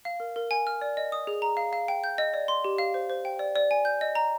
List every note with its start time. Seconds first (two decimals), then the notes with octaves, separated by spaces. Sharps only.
0.05 F5
0.20 A#4
0.36 A#4
0.51 G#5
0.67 F6
0.81 D5
0.97 D#5
1.12 D#6
1.27 G#4
1.42 A#5
1.57 F5
1.73 F5
1.88 G5
2.04 G6
2.18 D#5
2.34 D5
2.48 C6
2.64 G4
2.78 F5
2.94 C5
3.10 C5
3.25 G5
3.39 D5
3.56 D5
3.71 G#5
3.85 G6
4.01 D#5
4.15 A#5